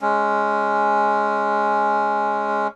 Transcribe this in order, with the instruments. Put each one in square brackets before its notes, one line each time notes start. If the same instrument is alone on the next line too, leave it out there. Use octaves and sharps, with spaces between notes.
[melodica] G#3 C#4